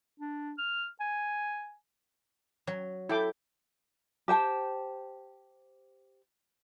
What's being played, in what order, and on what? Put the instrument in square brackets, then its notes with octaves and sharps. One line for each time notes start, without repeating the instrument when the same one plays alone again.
[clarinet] D4
F6
G#5
[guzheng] F#3
[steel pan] E4 G5 D6 [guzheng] A4
[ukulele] G4 C5 G5 A5